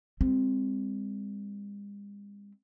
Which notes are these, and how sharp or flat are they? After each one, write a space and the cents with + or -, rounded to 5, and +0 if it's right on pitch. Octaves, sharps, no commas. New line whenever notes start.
G#3 -45 C4 +0